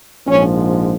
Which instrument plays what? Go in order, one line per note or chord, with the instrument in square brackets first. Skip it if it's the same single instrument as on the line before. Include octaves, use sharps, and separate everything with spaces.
[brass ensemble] A#1 G#2 F3 C#4